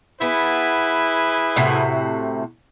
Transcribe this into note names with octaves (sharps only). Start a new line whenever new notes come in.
B3 E4 G#4 B4
A2 C3 F#4